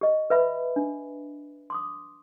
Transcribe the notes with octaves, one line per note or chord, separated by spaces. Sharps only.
G4 D#5
B4 E5 B5
D4
C6 D6 D#6